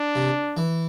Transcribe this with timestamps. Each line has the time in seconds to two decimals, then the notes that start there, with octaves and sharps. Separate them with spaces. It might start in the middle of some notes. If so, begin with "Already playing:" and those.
Already playing: D4
0.15 C3
0.57 E3